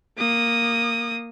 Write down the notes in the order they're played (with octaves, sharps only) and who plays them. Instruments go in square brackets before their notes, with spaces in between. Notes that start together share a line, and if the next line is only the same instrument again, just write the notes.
[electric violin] A#3 D#6